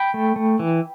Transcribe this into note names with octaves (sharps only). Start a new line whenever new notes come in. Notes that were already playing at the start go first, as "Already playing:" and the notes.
Already playing: G5 B5
A3
A3
E3